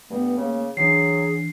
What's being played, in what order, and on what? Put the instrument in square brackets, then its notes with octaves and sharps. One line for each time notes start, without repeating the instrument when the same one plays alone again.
[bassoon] G2 [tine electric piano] A3 [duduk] B3
[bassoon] C#3 [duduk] A#3
[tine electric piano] E3 D4 [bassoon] F#3 [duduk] G#4 [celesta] C7